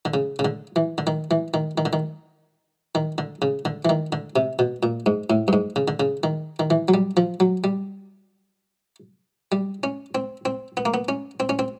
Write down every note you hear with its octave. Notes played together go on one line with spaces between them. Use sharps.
D3
C#3
C#3
D3
E3
D3
D#3
E3
D#3
D#3
D3
D#3
D#3
D3
C#3
D3
E3
D#3
D3
C3
B2
A#2
G#2
A2
G2
G#2
C#3
D3
C#3
D#3
D#3
E3
F#3
G3
F3
F#3
G3
G3
C#4
C4
C4
B3
A#3
B3
C#4
C4
C#4
C4